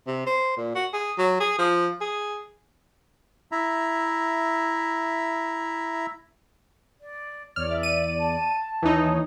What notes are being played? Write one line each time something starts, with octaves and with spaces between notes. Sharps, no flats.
C3
C5
A#2
F#4
G#4
F#3
G#4
F3
G#4
E4 E5 A#5
D5
E2 C#5 D5 F6
E5
D#7
A5
D#2 E3 D#4 C#5